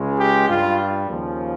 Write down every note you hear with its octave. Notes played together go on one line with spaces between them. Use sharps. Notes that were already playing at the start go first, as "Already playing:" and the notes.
Already playing: C#2 C#3 G#3
G4
G2 G3 F4
D#2 C#3 F3